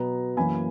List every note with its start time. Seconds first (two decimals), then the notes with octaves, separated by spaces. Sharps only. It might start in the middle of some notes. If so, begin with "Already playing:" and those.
Already playing: B2 F#3 B3 A#5
0.37 F#2 E3 A#3 G#5 B5